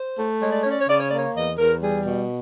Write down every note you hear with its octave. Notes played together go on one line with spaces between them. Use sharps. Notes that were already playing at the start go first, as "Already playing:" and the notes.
Already playing: C5
A3
G#3 C#5
D5
C#4 C#5
D5
C#5
C#3 D5
C#5
A#3 D5
C#5
E2 D#5
E2 A#4
G3 G#4
B2